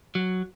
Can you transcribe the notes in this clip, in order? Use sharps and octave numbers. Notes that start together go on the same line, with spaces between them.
F#3